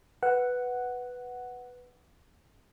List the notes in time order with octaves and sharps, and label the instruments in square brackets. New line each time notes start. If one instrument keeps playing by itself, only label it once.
[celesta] B4 [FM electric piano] F#5